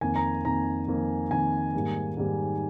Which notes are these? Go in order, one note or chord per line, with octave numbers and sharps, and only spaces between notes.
F2 D#3 A#3 G#5
A#5
F2 D#3 A#3 A#5
F2 D#3 A#3
F2 D#3 A#3 G#5
G#2 D#3 G3 A#3
G#2 D#3 G3 A#3